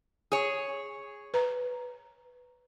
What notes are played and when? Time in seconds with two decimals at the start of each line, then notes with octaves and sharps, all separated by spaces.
0.32 G#4 C#5
1.34 B4 A#5